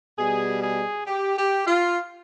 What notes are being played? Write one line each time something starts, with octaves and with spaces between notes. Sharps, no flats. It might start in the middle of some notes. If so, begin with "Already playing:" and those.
B2 G3 G#4
G#4
G4
G4
F4